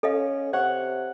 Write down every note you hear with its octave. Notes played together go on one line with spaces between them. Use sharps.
C#4 A4 D#5 F5
C3 C#5 F#5 G#6